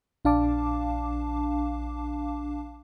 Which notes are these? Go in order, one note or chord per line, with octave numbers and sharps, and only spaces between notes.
A#1 D4 F5 A5 D6